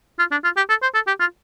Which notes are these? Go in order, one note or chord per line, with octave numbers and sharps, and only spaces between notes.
F4
D4
F4
G4
A4
C5
A4
G4
F4